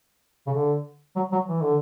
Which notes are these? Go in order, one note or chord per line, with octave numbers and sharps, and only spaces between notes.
C#3
D3
F#3
F#3
E3
D3